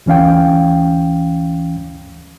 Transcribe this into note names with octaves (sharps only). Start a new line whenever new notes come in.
D2 E3 C#4 F5 G5